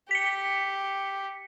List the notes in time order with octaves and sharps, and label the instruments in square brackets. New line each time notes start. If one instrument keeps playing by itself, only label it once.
[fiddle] G4 [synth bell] B6 C#7